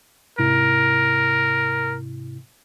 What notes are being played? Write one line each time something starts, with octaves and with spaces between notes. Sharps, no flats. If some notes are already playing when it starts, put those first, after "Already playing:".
G#2 C3 E4 A#4